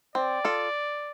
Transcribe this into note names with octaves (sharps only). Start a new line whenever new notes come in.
C4 D5
F4 A4